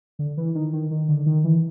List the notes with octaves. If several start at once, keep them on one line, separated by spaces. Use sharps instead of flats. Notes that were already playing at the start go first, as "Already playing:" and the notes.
D3
E3
D#3
D#3
D#3
D3
D#3
E3